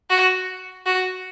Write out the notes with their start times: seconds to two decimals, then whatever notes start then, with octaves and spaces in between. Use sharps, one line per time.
0.10 F#4
0.86 F#4